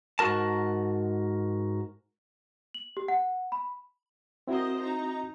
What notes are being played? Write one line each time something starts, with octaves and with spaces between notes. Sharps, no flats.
G#2 F#4 A#4 A5
F#7
G4
F#5
B5
C4 E4 F#4 A#4 C5 D#5
D#4 A#5